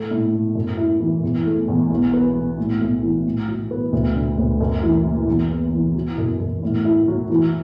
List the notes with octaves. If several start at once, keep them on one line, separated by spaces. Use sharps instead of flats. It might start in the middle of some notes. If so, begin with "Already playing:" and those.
Already playing: A2 A3
A2
A2
F#2
E4
E3
E2
A3
E2
B1
B3
B1
A2
B1
E3
A2
F#3
B3
D2
D3
D2
F#2
E3
F#1
E2
B3
E3
F#3
F#2
F#2
A2
E4
F#3
E3